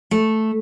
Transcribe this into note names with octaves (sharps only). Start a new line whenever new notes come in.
A3